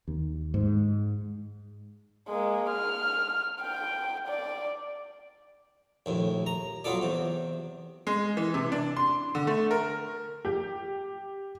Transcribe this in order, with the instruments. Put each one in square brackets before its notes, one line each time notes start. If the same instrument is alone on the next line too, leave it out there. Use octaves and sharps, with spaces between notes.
[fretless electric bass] D#2
G#2
[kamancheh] G#3 A#3
F6
G5
D5
[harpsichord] A#1 D#2 A2
A#5
F#3 B3 F4 A4 D5
E2 C3
[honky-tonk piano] G#3
E3
C3
D4
C6
D3
A3
A#4
G4